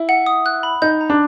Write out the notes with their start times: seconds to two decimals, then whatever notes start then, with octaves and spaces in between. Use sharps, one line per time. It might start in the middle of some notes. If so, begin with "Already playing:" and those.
Already playing: E4
0.09 F#5
0.26 D#6
0.46 F#6
0.63 B5
0.82 D#4 G6
1.01 A#5
1.10 D4